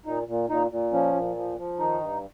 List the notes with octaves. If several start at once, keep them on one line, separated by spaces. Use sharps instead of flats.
A#2 D#4
A#2
A#2 D#4
A#2
F3 C#4
A#2
F3
F3
D#3 D#4
G2